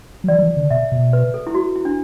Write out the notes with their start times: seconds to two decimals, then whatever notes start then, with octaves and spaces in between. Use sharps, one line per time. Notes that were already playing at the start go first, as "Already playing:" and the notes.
0.24 F#3
0.28 E3 D5
0.38 F#3
0.43 E3
0.57 D3
0.71 B2 E5
0.92 B2
1.13 B4
1.34 A4
1.47 E4
1.54 F#4
1.76 E4
1.85 D4